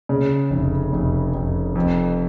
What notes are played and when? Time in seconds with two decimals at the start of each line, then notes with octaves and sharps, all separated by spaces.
0.09 C#3
0.50 F1
0.92 F1
1.34 F1
1.75 F2